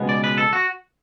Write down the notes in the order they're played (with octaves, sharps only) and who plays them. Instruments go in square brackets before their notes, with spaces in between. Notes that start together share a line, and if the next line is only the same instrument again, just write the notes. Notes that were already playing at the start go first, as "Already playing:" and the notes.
Already playing: [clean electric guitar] C#2 B2 G#3 B3
D5
B4
A4
F#4